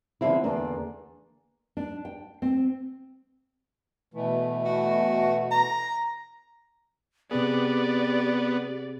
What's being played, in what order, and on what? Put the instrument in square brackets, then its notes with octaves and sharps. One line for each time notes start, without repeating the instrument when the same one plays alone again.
[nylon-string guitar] D3 F3 B3 C4 E4
E2 D3 A#3 D4
D4
G5
C4
[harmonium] B2 E3 A3
[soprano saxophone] F#4
A#5
[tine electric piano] C3 C4 G#4 [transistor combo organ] B3 [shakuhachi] G4 [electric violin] D5